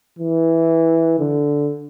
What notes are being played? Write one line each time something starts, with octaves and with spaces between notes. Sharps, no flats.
E3
D3